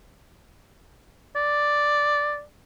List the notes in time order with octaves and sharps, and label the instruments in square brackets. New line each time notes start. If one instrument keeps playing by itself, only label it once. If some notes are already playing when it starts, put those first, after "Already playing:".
[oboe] D5